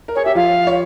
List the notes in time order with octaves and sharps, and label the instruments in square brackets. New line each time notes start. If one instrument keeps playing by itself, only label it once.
[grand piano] A#4
[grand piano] G#4 [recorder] C#5
[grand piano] G4 [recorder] E5
[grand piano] F3 F4 [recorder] F5
[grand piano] C#5